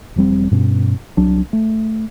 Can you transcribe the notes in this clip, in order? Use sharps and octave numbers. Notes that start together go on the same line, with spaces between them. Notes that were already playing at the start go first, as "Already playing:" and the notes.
E1 F3 G3 C4
G2 B2 C#4
C2 F#3 D4
A3